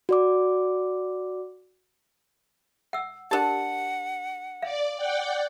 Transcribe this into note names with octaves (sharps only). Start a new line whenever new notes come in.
F#4 D5 D6
F#5 E6
D4 G4 A#4 F#5 A5
D5 F5
D5 F#5 G5